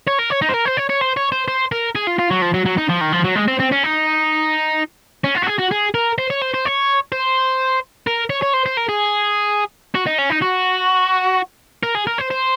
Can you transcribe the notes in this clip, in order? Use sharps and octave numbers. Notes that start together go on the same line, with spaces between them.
C#5
A#4
C#5
D#4
C5
A#4
C5
C#5
C#5
C5
C#5
C5
C5
A#4
G#4
F4
F4
F#3
F3
F#3
F#3
D#4
F3
D#3
F3
F#3
G#3
C4
C4
C#4
D#4
C#4
F4
F#4
G#4
F#4
G#4
A#4
C5
C#5
C5
C5
C#5
C5
A#4
C#5
C#5
C5
C5
A#4
G#4
F#4
D#4
C#4
D#4
F#4
A#4
G#4
A#4
C5
C5